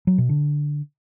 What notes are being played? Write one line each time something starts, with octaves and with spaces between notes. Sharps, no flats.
F#3
B2
D3